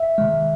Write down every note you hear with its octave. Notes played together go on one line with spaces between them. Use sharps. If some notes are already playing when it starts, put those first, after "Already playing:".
Already playing: E5
C3 D#3 G#3